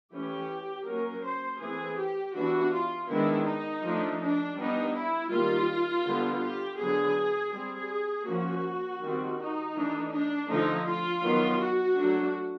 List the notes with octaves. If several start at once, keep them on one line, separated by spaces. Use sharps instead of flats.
E3 A3 C#4 G4
F#3 A#3 C#4 A#4
C5
E3 A3 C4 G#4
G4
E3 G3 B3 D4 F#4
F4
D#3 G#3 B3 D4 E4
D#4
F3 A3 D4
D4
G3 B3 D4 D#4
E4
D#3 G3 A#3 F4
D3 G3 B3 D4
G4
D3 F#3 B3 D4 G#4
G3 C4 G#4
F3 A#3 C#4 F#4
D#3 G3 C4
D#4
E3 A3 D4
D4
D3 F3 A3 D#4
F4
D#3 F#3 B3
F#4
F#3 A3 D4